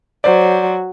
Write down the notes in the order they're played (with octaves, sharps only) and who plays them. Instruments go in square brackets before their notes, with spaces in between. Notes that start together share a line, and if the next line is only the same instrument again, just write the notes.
[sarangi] F#3 [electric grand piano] C5 D5